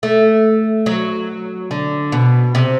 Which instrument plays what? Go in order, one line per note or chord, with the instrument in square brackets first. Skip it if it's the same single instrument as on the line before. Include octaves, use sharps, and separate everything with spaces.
[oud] A3
F#3
D3
B2
C3